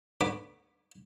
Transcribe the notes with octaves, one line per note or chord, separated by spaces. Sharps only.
D2 B3 B5 D6